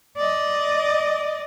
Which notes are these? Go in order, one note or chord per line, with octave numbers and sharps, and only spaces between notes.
D5 D#5